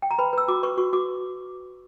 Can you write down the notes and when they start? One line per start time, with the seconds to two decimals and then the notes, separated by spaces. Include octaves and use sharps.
0.02 G5
0.11 A#5
0.19 B4 B5
0.33 B4 E6
0.48 F#4 D6
0.63 B4 C#6
0.77 F#4 C#6
0.93 F#4 D6